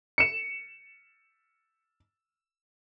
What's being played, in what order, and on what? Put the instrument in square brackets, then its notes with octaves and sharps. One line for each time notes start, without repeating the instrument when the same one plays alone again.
[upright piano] C#7 E7